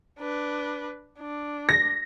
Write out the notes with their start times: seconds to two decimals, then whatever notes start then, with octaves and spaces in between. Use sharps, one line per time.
0.19 D4 B4
1.19 D4
1.69 A#6